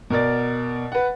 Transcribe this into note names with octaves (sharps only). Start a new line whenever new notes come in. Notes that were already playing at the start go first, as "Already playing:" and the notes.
B2 A#4 D5 A6
B4 F#5